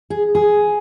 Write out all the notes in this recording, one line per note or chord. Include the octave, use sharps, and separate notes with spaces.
G#4
G#4